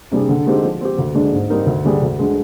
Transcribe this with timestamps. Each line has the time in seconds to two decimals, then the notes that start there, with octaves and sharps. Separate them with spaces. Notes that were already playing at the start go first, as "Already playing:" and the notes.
0.11 C3 G3 D4 G#4
0.29 D3
0.46 G#3 C4 D#4 G4
0.63 F3
0.81 C4 G4
0.98 D2
1.15 D3 G#3 D4
1.32 G#2
1.50 G3 C4 D#4 A#4
1.66 D2
1.84 D3 G3 D4 G#4
2.02 D2
2.19 D3 G#3